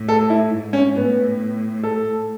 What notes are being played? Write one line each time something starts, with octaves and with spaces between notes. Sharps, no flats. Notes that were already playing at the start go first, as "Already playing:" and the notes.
Already playing: A2
A4
E4
G#2
C#4
A2 B3
A4